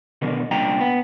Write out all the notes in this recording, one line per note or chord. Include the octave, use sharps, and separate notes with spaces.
B2 D3 D#3 A#4
C2 A#2 D4 G5 A#5
B3